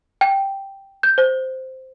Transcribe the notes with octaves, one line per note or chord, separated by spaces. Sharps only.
G5
G6
C5